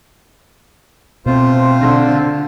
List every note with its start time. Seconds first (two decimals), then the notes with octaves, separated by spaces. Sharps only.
1.26 B2 A3 C4 F4 C5
1.80 D3